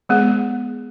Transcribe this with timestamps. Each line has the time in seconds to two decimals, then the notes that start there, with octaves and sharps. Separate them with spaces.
0.09 G#3 B3 G#4